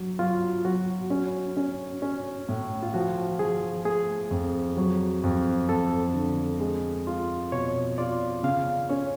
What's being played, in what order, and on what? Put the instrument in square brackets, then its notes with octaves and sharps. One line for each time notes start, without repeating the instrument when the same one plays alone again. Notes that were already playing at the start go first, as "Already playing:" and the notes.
Already playing: [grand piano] F#3
[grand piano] F#3 [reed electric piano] F4
[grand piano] F#3 [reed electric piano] F#4
[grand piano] C#4
C#4
C#4
A2
[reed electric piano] F4
[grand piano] F3 [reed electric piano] F#4
[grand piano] F3 [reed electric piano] G#4
[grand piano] A3 [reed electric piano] G#4
[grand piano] F2
F#3
F2
[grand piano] F2 [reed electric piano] A4
[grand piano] D3
G#3
F4
[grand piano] B2 [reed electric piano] C#5
[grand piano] F4 [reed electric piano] D5
[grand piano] C#3 [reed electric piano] F5
[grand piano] C#4 [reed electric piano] C#5